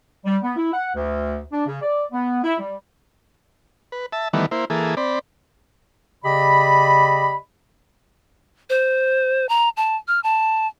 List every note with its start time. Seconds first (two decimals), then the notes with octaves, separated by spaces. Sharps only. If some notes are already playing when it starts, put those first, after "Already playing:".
0.25 G3
0.43 B3
0.56 E4
0.72 F#5
0.94 D2
1.52 D4
1.67 C#3
1.81 D5
2.12 B3
2.43 E4
2.58 G3
3.92 B4
4.12 E5 A5
4.33 D#3 E3 G3 A3 B3
4.51 A#3 E4 C5
4.70 E3 A#3 G#4 A4
4.97 C4 D5 B5
6.25 C#3 G4 D5 D#5 B5
8.70 C5
9.49 A#5
9.77 A5
10.08 F6
10.24 A5